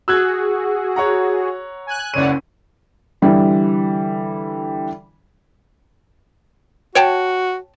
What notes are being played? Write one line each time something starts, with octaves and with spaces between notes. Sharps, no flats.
F#4 G#4 E6 F#6 G#6
C#5 F#5 A#5
G#5 F#6
F#1 C#2 C#5 D5 F#5 D#7
D3 E3 G3
F#4 C#5 G5 A5